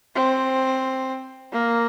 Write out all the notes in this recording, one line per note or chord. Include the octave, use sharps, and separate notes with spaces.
C4
A#3